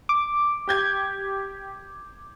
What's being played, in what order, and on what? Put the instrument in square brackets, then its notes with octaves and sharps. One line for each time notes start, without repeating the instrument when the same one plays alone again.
[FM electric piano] D6
[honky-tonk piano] G4 G6 G#6